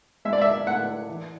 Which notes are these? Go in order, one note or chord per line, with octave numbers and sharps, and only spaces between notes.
G#3 E5
D5
E5
A2 F#5
E3